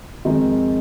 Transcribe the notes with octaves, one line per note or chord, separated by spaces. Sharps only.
F2 D#3 G#3 C4 D#4